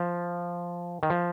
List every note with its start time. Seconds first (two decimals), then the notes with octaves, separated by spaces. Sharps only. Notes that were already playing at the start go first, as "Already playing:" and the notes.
Already playing: F3
1.03 D#3
1.10 F3